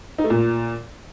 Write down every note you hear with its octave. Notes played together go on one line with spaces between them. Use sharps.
D#4
A3
A#2